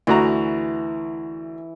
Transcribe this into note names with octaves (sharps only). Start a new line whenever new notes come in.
D2 E3 F#4 A#5